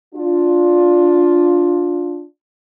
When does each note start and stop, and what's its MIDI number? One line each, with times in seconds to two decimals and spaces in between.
0.15 2.25 62
0.15 2.25 65